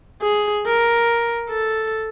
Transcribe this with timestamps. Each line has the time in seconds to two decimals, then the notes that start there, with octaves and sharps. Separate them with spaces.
0.22 G#4
0.66 A#4
1.50 A4